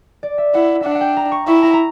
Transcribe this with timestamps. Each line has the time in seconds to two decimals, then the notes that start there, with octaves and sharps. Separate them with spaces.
0.23 D5
0.38 E5
0.54 E4 F#5
0.81 D4 E5 F#5
0.95 F#5
1.01 G5
1.17 A#5
1.32 C#6
1.47 E4 C#6
1.63 A#5
1.73 A#5